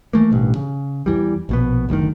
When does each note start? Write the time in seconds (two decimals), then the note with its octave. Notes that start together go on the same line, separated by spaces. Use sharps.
0.13 E3 A3 A#3
0.31 A1 G2 B2
0.55 C#3
1.06 E2 E3 G3
1.49 A#1 B2 B3
1.89 F#1 D2 B2 D#3